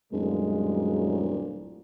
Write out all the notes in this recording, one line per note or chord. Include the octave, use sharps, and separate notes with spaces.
D1 F#2 A#2 G3 G#3